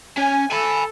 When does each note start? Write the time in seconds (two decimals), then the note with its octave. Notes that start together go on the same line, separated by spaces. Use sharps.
0.18 C#4 G#5
0.52 A4 G#5 B5